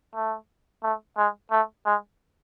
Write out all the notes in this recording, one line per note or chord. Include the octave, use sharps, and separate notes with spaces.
A3
A3
G#3
A3
G#3